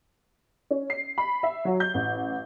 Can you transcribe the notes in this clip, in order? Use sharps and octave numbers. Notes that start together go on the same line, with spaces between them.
C#4
C7
B5
E5
F#3
G6
A1